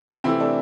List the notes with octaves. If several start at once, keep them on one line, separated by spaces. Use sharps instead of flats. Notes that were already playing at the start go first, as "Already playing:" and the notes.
C3 E3 A3 C4 E4
A3 D4